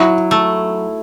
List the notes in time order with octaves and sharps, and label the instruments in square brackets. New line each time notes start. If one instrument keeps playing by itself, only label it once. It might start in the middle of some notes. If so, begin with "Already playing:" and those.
Already playing: [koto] F#3 [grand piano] E4
[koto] A3